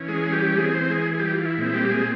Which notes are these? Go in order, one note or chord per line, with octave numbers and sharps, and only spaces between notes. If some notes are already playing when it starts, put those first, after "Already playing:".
Already playing: E3 C#4
G#3 G#4
G3 G4
E3 G#3 C4 G#4
C4 C5
G#3 G#4
G#4
G3 G4
F4
E4
A#2 G#3 C4 E4
G3 G4
G#3 G#4